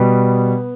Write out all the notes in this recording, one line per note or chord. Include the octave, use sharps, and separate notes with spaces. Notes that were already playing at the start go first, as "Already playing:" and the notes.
Already playing: B2 G3 B3